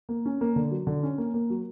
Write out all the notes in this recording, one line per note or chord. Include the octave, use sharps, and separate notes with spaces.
A#3
C#4
A#3
D3
F#3
D3
C#4
A#3
A#3
F#3